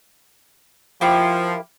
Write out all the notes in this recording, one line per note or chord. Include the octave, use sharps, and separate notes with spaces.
F3 A#3 E4 G4